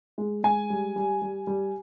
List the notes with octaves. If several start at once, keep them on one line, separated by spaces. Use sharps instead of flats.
G#3
G#3 G#5
G3
G3
G3
G3